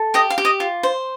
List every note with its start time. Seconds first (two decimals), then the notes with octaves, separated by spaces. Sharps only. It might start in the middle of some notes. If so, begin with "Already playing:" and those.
Already playing: A4
0.14 G4 D#5 G5
0.30 F5
0.38 G4
0.45 D#5
0.60 F4
0.83 C5